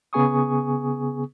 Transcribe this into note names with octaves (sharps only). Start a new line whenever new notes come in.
C#3 B3 G#4 G#5 C#6 D#6